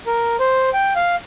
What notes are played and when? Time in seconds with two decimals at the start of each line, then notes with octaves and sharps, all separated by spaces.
0.06 A#4
0.39 C5
0.73 G5
0.95 F5